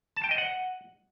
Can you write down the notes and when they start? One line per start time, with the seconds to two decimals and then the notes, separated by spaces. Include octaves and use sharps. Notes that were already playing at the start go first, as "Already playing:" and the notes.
0.16 A5
0.24 G5
0.31 D#5
0.38 F#5